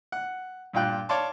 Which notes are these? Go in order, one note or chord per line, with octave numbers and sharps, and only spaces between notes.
F#5
G2 A#2 F4 G5 F#6
C#5 D5 F5 A5 C6 D6